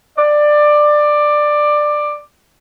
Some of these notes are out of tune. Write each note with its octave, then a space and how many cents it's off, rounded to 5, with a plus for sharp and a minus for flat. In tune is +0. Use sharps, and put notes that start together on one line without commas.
D5 +15